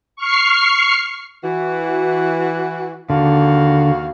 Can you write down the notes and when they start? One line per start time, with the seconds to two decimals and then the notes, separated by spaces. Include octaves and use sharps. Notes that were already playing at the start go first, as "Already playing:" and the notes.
0.16 C#6 F6 C7
1.43 E3 F#4
3.10 D#2 D3 F#4 F5